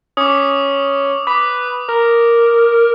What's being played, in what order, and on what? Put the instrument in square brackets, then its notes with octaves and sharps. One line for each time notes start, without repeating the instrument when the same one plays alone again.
[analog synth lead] C#4 [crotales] D6 D#6
[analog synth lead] B4 [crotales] D6
[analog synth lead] A#4